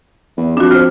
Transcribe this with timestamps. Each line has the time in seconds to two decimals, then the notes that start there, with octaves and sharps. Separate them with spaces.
0.38 E2
0.57 F2 D4 F#4
0.71 C5 F6